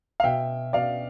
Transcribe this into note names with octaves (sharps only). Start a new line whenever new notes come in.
F5
B2 E5 G5
B2 D5 F5